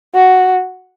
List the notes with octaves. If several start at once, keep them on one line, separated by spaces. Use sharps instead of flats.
F#4